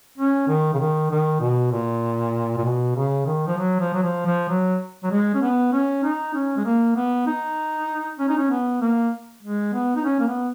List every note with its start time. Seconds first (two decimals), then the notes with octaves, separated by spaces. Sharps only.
0.18 C#4
0.48 D#3
0.74 C#3
0.80 D#3
1.11 D#3
1.41 B2
1.72 A#2
2.58 A#2
2.64 B2
2.96 C#3
3.26 D#3
3.47 F3
3.57 F#3
3.80 F3
3.94 F#3
4.03 F3
4.26 F3
4.49 F#3
5.04 F#3
5.11 G#3
5.34 C#4
5.42 B3
5.73 C#4
6.04 D#4
6.35 C#4
6.57 G#3
6.65 A#3
6.96 B3
7.27 D#4
8.19 C#4
8.29 D#4
8.38 C#4
8.50 B3
8.81 A#3
9.43 G#3
9.73 B3
9.96 D#4
10.05 C#4
10.20 A#3
10.27 B3